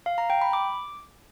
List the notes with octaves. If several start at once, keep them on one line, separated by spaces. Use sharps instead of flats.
F5
A#5
G5
B5
D6